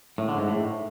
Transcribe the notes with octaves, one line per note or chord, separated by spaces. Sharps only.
A2
D3
G#2
A2